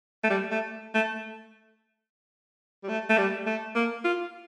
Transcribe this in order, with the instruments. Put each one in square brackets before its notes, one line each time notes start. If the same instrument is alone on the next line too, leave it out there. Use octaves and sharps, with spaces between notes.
[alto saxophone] A3
G3
A3
A3
G3
A3
A3
G3
A3
A#3
F4